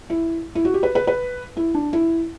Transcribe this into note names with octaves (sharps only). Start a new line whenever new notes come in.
E4
E4
F#4
G4
B4
B4
B4
E4
D4
E4